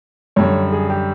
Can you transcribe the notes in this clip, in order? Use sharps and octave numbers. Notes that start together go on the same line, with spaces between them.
F#2 D3 G3 C#5
G#4
G4